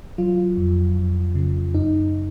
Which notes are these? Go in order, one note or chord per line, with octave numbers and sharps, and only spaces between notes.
F#3 F4
F2
F2
C#3
F#2 D#4